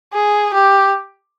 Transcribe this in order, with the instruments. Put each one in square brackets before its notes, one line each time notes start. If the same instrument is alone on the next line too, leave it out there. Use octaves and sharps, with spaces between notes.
[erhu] G#4
G4